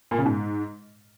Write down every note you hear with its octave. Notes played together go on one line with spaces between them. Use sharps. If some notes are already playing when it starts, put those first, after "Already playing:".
A#2
C#3
G#2